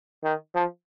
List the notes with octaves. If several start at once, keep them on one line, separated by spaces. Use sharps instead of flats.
D#3
F3